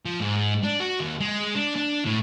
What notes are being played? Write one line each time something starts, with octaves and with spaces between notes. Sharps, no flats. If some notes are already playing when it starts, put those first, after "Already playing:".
F3
G#2
D4
F#4
D#2
G#3
D4
D4
A2